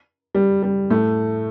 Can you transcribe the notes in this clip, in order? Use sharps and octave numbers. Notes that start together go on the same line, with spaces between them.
G3
G3
A2 A3